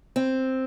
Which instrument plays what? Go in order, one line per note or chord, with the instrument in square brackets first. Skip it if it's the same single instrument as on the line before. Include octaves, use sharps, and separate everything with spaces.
[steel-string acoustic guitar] C4